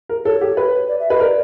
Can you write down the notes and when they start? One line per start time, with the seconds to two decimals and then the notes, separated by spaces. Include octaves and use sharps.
0.09 A#4
0.25 A4 C#5
0.41 G4
0.57 B4
0.88 D5
1.00 E5
1.10 B4 D#5
1.20 A#4 D5